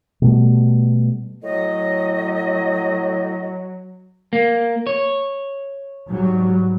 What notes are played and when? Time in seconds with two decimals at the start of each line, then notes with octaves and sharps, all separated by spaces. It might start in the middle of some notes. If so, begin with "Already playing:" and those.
0.22 B2 G3 A3
1.43 A2 F#3 D#5
4.33 A#3
4.87 C#5
6.08 G#2 F#3 G3